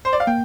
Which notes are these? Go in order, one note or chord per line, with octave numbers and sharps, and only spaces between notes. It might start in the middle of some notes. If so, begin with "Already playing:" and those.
C5
D5
F5
A#3 G5